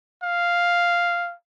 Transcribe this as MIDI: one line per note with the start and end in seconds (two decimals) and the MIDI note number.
0.23 1.34 77